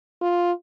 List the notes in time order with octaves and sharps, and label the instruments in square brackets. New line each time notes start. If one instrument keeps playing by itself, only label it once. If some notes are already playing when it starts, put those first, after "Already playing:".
[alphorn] F4